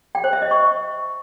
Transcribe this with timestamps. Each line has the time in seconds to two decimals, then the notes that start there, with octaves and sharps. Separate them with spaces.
0.15 G5
0.24 C5
0.33 E5
0.42 D#5
0.51 C#6